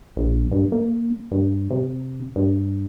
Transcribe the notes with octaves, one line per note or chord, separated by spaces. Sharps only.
A#1
G2
A#3
G2
C3
G2